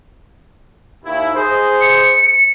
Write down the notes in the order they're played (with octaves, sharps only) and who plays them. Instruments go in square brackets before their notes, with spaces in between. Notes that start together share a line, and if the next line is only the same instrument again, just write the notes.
[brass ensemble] D#2 E4
G#4 C5 D#5
[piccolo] C#7